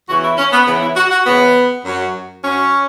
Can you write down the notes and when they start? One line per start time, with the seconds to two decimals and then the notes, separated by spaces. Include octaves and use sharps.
0.08 E2 C#3 E3 F#4
0.23 E4
0.38 C#4
0.52 B3
0.67 E2 C#3 E3 B3
0.82 E4
0.96 F#4
1.11 F#4
1.26 E2 C#3 E3 B3
1.85 F#2 F#3
2.44 F#2 F#3 C#4